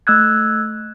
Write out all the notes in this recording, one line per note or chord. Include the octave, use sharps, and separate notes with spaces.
A3 E6 F#6 G#6